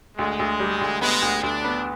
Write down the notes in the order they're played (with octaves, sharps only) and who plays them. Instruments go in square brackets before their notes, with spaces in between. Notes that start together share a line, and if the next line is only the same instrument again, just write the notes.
[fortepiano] D2 [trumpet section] G#3
[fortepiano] D2
G3
D2
[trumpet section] G#3 [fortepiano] B3
[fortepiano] D2
[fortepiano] D2 [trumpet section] D4
[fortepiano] B3